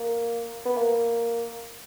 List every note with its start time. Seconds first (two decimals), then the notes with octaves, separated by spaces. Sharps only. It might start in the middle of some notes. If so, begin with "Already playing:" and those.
Already playing: A#3
0.65 B3
0.77 A#3